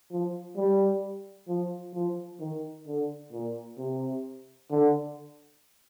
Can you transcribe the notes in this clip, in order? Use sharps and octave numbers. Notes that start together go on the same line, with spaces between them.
F3
G3
F3
F3
D#3
D3
A#2
C3
D3